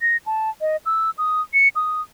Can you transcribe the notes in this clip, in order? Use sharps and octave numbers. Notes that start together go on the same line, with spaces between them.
A#6
A5
D#5
E6
D#6
C#7
D#6